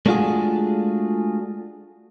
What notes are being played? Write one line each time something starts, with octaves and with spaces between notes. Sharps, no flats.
G#3 A3 D4 F4 F#4 G#4